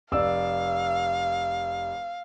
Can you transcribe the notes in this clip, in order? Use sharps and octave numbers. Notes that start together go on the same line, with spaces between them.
F1 D5 F5 E6